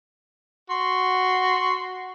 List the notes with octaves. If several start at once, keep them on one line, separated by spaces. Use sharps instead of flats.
F#4 C6